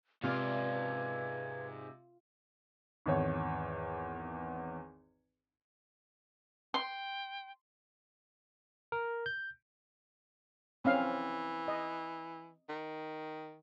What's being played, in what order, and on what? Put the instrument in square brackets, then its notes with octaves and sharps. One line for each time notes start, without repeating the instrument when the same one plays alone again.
[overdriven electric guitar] G#2 D5 [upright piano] C3 [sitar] F4 [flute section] B4 G#5 G#6
[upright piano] G#1 E2 C#5
[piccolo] G5 [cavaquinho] C6
[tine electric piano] A#4
G6
[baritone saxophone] E3 [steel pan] C4 C#4 F5
[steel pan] D#5
[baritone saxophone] D#3